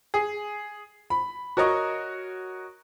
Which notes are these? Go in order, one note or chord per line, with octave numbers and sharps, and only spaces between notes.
G#4
B5
F#4 A#4 C#5 D#5